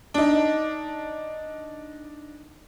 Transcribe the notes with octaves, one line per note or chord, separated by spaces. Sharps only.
D4 D#4